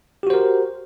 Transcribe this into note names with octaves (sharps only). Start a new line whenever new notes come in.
F#4 G4 A#4 C5